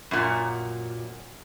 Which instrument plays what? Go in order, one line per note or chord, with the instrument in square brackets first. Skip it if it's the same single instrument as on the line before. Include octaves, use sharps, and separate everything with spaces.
[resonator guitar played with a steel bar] F#2 A#2